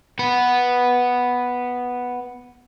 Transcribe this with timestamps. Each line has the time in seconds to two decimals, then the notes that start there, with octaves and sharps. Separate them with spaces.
0.19 B3 B4